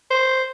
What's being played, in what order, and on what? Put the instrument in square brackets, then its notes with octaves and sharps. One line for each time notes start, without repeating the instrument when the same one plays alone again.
[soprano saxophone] C5